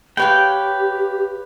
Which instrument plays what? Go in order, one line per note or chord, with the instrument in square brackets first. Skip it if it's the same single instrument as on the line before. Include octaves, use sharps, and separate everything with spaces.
[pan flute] G4 [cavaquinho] B4 C#5 F5 [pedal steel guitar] G5